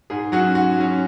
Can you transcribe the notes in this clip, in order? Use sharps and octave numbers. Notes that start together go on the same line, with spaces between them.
G#2 G#4
F#3 C#4 F#4
G#2 F#4
F#3 C#4